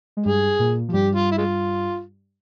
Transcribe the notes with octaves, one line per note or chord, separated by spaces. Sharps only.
G#3
G2 G3 G#4
A#2 A#3
F3
G2 G3 G4
F4
E4
G#3 F4